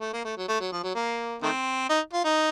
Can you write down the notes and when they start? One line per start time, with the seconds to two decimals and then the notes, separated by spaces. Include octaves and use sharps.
0.01 A3
0.13 A#3
0.25 A3
0.37 F#3
0.48 A3
0.60 F#3
0.72 F3
0.83 F#3
0.95 A#3
1.42 D#3 A3 C4
1.89 D#4
2.13 F4
2.25 D#4